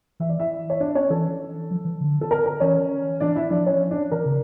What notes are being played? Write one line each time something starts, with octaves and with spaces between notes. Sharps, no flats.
E3 E5
D5
E4 E5
C#5
D4 D5
C#4 C#5
E3 A4
F3
E3
D3
A4
A#4
A#4
E3 C#4 C#5
E3 D4 D5
E4 E5
F3 D4 D5
C#4 C#5
D4 D5
E3 A#4
C#3